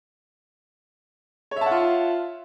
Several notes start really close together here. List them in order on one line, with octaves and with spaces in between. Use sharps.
C#5 E5 A5 F#5 F4